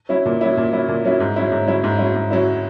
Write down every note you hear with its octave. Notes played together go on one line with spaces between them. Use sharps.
F#3 C#4 E4
A#2
F#3 C#4 E4
A#2
F#3 C#4 E4
A#2
F#3 C#4 E4
G#2
F#3 C#4 E4
G#2
F#3 C#4 E4
G#2
F#3 C#4 E4
G#2
F#3 C#4 E4